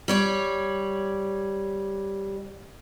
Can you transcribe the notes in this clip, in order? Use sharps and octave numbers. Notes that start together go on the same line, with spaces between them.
G3 C#5 D5